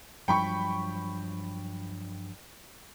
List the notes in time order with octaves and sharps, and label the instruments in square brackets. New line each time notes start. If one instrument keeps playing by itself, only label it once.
[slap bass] G2 F3 F#3 [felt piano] G5 B5 C#6